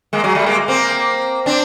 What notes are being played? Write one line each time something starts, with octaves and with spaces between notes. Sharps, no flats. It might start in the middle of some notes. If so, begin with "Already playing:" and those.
G#3 A#3
F#3 G#3
G3 A3
G#3 A#3
A#3 C4
C4 D4